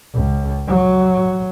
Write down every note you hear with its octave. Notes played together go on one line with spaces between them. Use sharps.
C#2
F#3